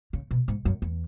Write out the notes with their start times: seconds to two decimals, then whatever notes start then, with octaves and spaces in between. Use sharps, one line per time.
0.13 C#3
0.31 B2
0.48 G#2
0.65 F#2
0.82 E2